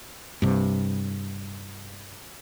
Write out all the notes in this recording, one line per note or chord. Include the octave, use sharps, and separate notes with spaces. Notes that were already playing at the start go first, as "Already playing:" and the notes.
G2 C3